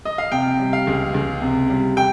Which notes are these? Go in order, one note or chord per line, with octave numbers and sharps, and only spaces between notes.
D#5
F5
C3 G5
G3
F5
C#2
C#2
C3
G3
G5